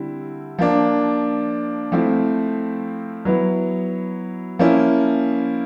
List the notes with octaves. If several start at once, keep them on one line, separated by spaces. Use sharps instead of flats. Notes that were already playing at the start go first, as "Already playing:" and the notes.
Already playing: D3 G3 C4 E4
F3 A#3 D4
F3 A3 C4 E4
F#3 B3 E4
F3 A#3 C#4 E4